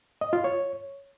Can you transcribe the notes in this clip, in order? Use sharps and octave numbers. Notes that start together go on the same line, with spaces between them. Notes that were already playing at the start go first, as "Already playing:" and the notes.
D#5
F4
C#5